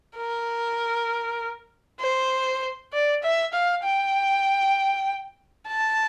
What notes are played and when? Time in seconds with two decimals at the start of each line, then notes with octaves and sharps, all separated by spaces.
0.17 A#4
2.00 C5
2.93 D5
3.23 E5
3.53 F5
3.83 G5
5.68 A5